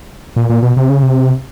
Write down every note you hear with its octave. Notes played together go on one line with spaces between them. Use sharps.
A#2
A#2
B2
C3
C#3
C3